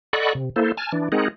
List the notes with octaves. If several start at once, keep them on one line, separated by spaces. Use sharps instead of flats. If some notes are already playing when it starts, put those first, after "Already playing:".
A4 D5 D#5 F#5 B5 C#6
C3
A#3 E4 A4 C5
G#5 A5 F6
E3 D4
G#3 C4 D#4 G#4 A#4 F#5